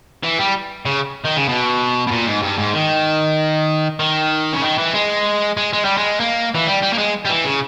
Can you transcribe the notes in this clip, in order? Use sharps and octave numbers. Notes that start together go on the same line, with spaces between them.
E3
G3
C#3
D#3
C#3
B2
B2
A#2
G#2
G2
G#2
D#3
D#3
C#3
D#3
E3
G#3
G#3
G#3
G3
G#3
A#3
E3
G3
G3
A#3
G#3
G3
E3
C#3